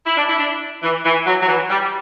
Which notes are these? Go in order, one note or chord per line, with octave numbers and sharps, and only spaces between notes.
E4
D4
E4
D4
E3
E3
F#3
F#3
E3
G3